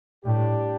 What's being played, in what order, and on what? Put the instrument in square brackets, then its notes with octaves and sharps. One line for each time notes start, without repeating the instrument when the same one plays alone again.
[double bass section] A2 [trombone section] G3 D4 G4